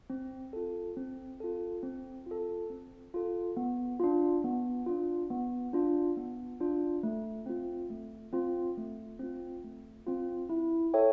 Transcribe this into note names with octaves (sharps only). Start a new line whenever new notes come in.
C4
F4 A4
C4
F4 A4
C4
F4 A4
C4
F4 A4
B3
D4 F4
B3
D4 F4
B3
D4 F4
B3
D4 F4
A3
C4 F4
A3
C4 F4
A3
C4 F4
A3
C4 F4
E4
A4 C#5 E5 G5